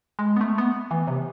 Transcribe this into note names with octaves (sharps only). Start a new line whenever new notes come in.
G#3
B3
A3
B3
E3
C3